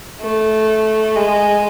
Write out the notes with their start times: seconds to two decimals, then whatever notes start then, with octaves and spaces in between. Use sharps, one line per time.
0.21 A3
1.16 G#3